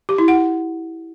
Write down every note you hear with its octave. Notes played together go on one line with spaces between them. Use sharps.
G4
E4
F#5